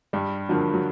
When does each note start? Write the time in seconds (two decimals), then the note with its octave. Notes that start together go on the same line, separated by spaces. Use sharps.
0.13 G2 G3
0.49 D3 F3 F#3 A#3
0.74 F#3